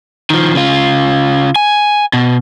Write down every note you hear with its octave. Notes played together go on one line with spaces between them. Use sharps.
D#3 F3
C#3 F4
G#5
B2